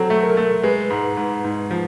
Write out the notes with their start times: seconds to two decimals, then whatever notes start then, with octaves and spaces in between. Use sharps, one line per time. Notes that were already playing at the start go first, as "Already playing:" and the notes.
Already playing: F#3 C4 A4
0.10 A3
0.23 A#4
0.37 A3
0.63 G#3 B4
0.90 G#2
1.17 G#2
1.44 G#2
1.71 F3